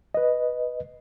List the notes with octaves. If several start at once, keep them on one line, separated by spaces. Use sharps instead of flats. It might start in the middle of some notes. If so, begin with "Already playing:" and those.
B4 D#5